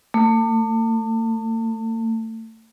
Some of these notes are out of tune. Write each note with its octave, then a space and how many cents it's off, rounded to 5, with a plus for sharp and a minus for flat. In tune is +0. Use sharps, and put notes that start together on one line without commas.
A3 +35